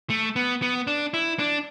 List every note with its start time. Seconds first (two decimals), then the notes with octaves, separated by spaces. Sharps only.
0.10 A3
0.36 B3
0.62 B3
0.87 D4
1.14 E4
1.39 D4